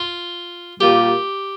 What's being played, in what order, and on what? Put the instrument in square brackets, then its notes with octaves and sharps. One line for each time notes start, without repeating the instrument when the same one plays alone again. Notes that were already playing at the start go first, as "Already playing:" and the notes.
Already playing: [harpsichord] F4
[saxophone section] A#2 G3 A#3 F4 [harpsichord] G4